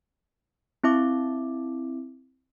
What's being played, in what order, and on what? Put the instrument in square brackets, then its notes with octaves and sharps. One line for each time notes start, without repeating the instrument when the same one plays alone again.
[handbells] C4 E4 E5 D6